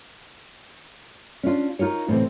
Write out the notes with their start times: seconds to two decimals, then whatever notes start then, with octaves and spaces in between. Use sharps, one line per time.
1.43 C#4 D4 F4
1.79 D#4 F4 A#4 C#5
2.08 A2 C3 E3 C4